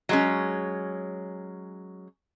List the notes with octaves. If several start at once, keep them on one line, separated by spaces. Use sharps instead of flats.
F#3 G#3 C#4